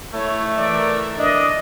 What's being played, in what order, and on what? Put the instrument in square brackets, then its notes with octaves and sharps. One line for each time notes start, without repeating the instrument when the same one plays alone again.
[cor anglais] A3 [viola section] E4 C#5
[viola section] E3 A#4 E5 [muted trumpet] D5
[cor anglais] D4 [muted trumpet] D#5